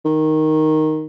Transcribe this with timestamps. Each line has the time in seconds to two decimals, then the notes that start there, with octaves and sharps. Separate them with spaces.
0.05 D#3